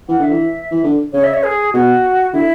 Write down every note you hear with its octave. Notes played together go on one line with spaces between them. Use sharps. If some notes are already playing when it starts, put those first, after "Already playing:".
E3 F#5
D3 E5
E3
E3
D3
C#3 C#5
E5
C#5
G#4
B2 F#4
D3 E4